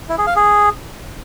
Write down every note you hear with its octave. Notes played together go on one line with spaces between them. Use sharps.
E4
G#4
F5
G#4